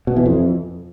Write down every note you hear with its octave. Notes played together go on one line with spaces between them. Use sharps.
B2
E3
F2